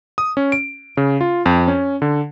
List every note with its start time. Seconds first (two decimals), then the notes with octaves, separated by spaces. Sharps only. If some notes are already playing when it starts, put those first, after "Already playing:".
0.18 D#6
0.37 C#4
0.52 D7
0.97 C#3
1.21 F4
1.46 F2
1.68 C#4
2.02 D3